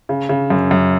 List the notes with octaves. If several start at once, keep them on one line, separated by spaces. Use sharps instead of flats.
C#3
C#3
F#2
F#2